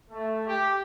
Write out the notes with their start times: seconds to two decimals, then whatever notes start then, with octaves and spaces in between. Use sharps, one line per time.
0.11 A3
0.47 G4